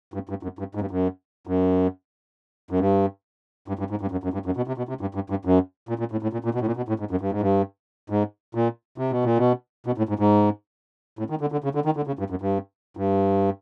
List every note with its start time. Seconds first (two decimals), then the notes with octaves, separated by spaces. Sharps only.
0.14 G2
0.29 G2
0.43 F#2
0.59 G2
0.75 G#2
0.81 G2
0.91 F#2
1.47 F#2
2.71 F#2
2.79 G2
3.68 G2
3.79 G2
3.91 G#2
4.01 G2
4.12 F#2
4.24 F#2
4.34 G2
4.46 F#2
4.57 B2
4.68 C3
4.78 B2
4.89 C3
5.01 G2
5.15 G2
5.30 G2
5.45 F#2
5.89 A#2
5.99 A#2
6.12 A2
6.23 A2
6.33 A#2
6.45 A#2
6.55 B2
6.61 A2
6.67 A#2
6.77 B2
6.89 A2
7.00 G#2
7.11 F#2
7.21 G2
7.32 G#2
7.41 G2
8.10 G#2
8.55 A#2
8.98 C3
9.11 B2
9.25 A#2
9.38 B2
9.86 B2
9.98 A2
10.09 G#2
10.19 G#2
11.19 A2
11.30 D#3
11.41 D3
11.52 D3
11.64 C#3
11.75 D3
11.86 D#3
11.97 D3
12.07 C#3
12.19 G2
12.30 F#2
12.42 G2
12.97 G2